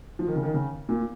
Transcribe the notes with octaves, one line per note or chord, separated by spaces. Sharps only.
F3
D#3
C#3
D#3
C#3
A#2